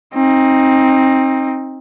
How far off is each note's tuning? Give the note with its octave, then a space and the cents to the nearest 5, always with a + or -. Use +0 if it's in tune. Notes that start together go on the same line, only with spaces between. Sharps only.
C4 +25 D#4 +10